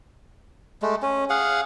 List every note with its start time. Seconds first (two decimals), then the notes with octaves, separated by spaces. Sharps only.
0.82 G#3 A3
1.02 C#4
1.30 G#4 F5 F#5